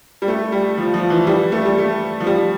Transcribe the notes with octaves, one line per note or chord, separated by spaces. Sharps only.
G3
A3
G3
F3
F3
E3
G3
A3
G3
A3
F3
G3